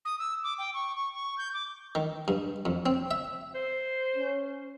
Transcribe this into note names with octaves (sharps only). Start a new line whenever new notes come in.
D#6
E6
D6
G5
C#6
C#6
C#6
G6
D6
D#3
G2
F2
C4
E5
C5
C#4